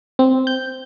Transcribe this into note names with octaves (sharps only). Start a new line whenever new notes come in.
C4
G6